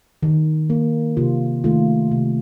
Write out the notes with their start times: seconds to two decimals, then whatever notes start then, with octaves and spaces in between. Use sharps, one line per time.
0.23 D#3
0.70 A#3
1.17 C3 F4
1.64 D#3 A3 F4
2.11 C3